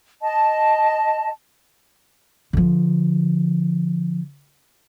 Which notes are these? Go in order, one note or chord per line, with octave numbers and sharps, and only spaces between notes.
D#5 A5
D3 F3